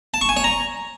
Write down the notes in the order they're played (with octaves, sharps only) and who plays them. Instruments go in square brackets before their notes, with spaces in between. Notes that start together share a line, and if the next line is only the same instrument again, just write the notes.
[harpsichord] A5
C#6
G#5
C#5
A#5